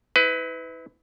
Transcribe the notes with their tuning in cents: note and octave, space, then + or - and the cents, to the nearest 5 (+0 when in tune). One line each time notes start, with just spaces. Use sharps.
E4 -35 B4 +25